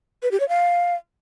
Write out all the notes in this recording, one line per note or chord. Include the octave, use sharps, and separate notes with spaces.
B4
G4
C#5
F5